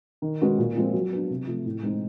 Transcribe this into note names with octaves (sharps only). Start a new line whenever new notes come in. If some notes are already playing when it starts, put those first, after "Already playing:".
D#3
G#3 C#4 F#4 B4
A#2
F3 G#3 C4
F#3
B3 D4
C3
F3 A3
A2
E3 G#3 C4 D#4